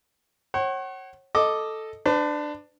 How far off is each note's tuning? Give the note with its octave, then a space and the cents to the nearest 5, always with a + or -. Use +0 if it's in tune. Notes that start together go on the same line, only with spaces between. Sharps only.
C#5 -35 F#5 +35
A4 +0 D#5 +0 D6 +5
D4 +15 B4 +45